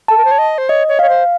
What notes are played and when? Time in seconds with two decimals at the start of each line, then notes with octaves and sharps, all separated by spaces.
0.08 A4 A5
0.18 A#4
0.25 C5
0.31 C#5
0.38 D#5
0.58 C5
0.69 C#5 D#5
0.88 C#5
0.99 C#5 F5
1.09 C5